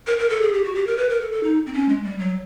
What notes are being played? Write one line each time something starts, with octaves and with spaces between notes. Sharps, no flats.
A#4
A#4
A4
G#4
G4
F#4
G4
A#4
B4
A#4
A4
A4
D#4
C4
C#4
G#3
G3
F#3